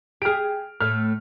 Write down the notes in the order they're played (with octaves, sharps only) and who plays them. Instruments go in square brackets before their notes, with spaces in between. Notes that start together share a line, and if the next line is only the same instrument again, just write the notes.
[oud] G4 G#4 [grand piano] F6 D7
[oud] A2 A3 [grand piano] F6